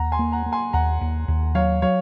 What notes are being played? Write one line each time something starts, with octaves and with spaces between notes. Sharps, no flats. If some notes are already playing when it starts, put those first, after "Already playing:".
Already playing: D#2 F#5 A#5
G#5 C6
A#3
F#5 A#5
A#3
G#5 C6
D#2 F#5 A#5
D#2
D#2
F#3 C#5 F5
F#3 C#5 F5